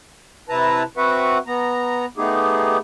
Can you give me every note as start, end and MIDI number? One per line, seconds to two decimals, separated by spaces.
0.49 0.83 48
0.49 0.83 64
0.49 0.83 71
0.49 0.83 81
0.49 0.83 82
0.97 1.38 60
0.97 1.38 66
0.97 1.38 71
0.97 1.38 76
0.97 1.38 78
1.47 2.05 59
1.47 2.05 82
2.17 2.78 57
2.17 2.78 59
2.17 2.78 63
2.17 2.78 67
2.17 2.78 68